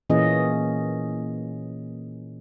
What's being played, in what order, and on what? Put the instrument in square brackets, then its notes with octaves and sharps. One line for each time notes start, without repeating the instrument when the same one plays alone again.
[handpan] A#2 E3 A#3 C#4 G#4 D#5